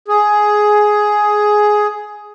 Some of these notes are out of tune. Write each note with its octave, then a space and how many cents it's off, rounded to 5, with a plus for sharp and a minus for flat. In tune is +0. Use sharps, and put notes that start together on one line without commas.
G#4 +10